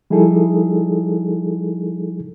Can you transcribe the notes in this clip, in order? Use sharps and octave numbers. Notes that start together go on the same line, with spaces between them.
F3 G3 D#4 E4 G#4 A4